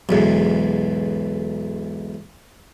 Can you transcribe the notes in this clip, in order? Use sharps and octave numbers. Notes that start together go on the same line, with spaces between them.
B1 E2 G#2